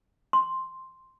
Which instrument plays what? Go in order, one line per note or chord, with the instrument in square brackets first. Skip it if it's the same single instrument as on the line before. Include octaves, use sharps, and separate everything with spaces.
[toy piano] C6